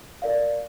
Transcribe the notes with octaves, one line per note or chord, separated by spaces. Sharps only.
A#4 D5 F5